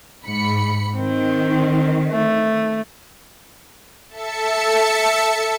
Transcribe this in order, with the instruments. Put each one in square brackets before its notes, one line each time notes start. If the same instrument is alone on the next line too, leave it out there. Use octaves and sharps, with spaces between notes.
[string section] G#2 B5 C#7
[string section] D#3 [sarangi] C4
[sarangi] A3
[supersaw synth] A4 E5 A5 C#7